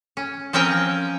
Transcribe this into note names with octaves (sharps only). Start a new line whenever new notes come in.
C#4
F3 C4 C#4 A#4 G5 G#5